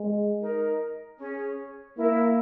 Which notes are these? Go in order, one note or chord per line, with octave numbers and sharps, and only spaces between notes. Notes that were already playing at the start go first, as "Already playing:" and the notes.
Already playing: G#3
D#4 A#4 D#5
C#4 G#4 C#5
A#3 E4 A#4 E5